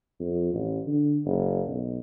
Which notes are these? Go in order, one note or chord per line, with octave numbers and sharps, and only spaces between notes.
F2
A1
D3
F#1
B1